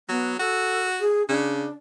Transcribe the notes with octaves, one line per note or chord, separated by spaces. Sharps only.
F#3 B3
F#4 A4
G#4
C#3 D4